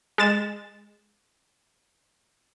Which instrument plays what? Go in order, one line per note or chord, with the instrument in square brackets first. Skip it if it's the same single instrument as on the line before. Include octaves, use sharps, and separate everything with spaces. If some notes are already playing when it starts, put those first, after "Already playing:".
[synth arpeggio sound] G#3 A6 E7